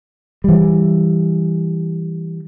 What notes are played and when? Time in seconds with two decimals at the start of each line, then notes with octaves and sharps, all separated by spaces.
0.44 E3 G3